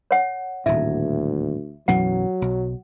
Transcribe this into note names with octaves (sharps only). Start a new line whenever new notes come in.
C#5 F#5
D#1 D2 A2 E5
B1 F#2 E3 F#3 F#5
B1